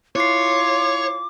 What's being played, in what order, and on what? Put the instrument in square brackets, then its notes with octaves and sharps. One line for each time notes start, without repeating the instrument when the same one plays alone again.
[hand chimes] E4 C7 [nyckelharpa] F4 [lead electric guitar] C#5 [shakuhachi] D6